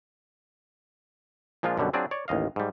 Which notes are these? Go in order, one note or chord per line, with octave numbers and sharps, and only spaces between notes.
A#2 F3 G#3 D4 F4
F#2 B2 D3 G3
F#3 C4 D4 F4 G#4 D5
C#5 D5
A1 D#2 D#5 F5
G#2 G3